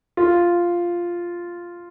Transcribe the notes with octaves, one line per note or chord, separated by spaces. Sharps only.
F4